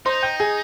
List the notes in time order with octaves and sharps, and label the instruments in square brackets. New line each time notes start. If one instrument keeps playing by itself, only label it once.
[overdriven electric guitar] D#4 [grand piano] C5 C6
[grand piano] G5 G6
G#4 G#5